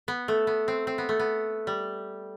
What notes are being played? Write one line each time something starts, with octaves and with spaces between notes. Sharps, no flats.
B3
A3
B3
C4
C4
B3
A3
B3
G3